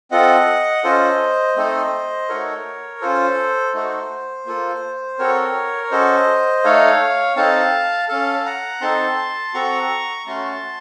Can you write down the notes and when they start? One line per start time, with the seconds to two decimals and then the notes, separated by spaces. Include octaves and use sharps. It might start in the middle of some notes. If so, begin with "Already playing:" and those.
0.11 C4 F4 A4 D#5 F#5
0.84 C#4 F4 A4 C5 D#5
1.56 A3 C4 D#4 A4
2.29 A3 D#4 F#4 A4 A#4 C#5
3.01 C#4 F4 A4 C5
3.74 A3 D#4 F#4 A4
4.46 A#3 F4 A4
5.19 C4 F#4 A4 A#4 C#5
5.84 C#5
5.91 C#4 F#4 A4 C5 D#5
6.64 A3 D#4 A4 C#5 F5
7.36 C4 D#4 A4 F5 A5
8.09 C#4 A4 F5 A5
8.46 F#5 A#5
8.81 C4 D#4 A4 A5 C6
9.54 C4 F#4 A4 A#5 C#6
10.26 A3 C#4 F#4 A5 C6